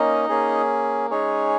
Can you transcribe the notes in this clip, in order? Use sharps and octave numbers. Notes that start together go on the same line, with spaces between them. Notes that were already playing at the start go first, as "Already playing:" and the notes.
Already playing: A#3 C#4 D#4 D#5
A#3 C#4 G#4
G#3 C#4 D#4 G#4 C#5